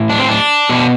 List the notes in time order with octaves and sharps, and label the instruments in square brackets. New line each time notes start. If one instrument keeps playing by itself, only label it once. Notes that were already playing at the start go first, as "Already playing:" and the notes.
Already playing: [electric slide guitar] A2 E3
D4
C4
D4
B2